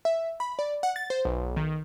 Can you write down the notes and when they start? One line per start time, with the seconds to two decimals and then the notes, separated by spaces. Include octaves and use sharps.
0.05 E5
0.40 B5
0.59 D5
0.83 F#5
0.96 A6
1.10 C5
1.25 B1
1.57 D#3